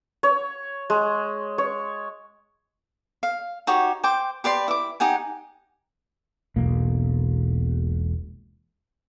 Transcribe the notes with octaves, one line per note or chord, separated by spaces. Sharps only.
C#5
G#3
C#5
F5
D#4 F#4 G4 C#5
C5 G5 D6
G4 B4 D5 C6
E4 D6
D#4 G4 F#5 G#5
E1 B1 A#3